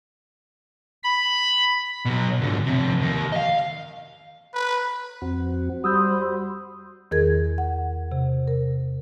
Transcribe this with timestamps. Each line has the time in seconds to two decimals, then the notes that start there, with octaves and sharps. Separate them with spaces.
1.03 B5
2.06 B2 F#3
2.42 G#2 D3
2.66 C3 F3
3.01 D#3 A#3
3.32 D#5 F5
4.54 B4
5.22 F2 C4 F#4
5.84 G3 F#4 C5 B5 C6 D#6 E6 G6
7.11 E2 D#3 G#4 A#4 G#6
7.58 F#5
8.12 C3
8.48 A#4